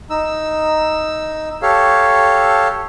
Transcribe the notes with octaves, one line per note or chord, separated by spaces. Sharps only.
D#4 E6
G4 A4 C#5 F5